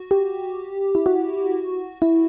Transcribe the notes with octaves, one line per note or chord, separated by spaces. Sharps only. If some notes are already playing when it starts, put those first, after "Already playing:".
Already playing: F#4
G4
E4
F#4
E4